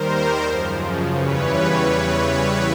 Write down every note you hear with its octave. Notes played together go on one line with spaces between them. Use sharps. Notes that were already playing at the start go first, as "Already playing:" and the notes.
Already playing: D#2 D#3 G3 A#4 C5
F#2 C#3 F3
E2 C#3 E3 G3 B4 C#5